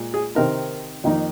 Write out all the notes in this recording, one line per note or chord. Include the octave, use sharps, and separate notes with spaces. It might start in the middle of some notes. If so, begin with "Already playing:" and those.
Already playing: A#2 G#3
G#4
C3 D#3 C4 D#4 A#4
F2 D#3 A#3 D#4